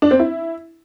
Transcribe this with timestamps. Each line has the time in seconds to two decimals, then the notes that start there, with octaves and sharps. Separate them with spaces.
0.02 D4
0.11 C4
0.20 E4